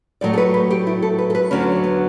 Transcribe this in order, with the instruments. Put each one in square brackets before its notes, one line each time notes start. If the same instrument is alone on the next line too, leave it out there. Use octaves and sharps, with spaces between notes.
[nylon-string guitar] A2 F#3 A3 D5
A4
B4
B4
G4
E4
A4
B4
A4
B4
D2 D3 F#3 C#4
B3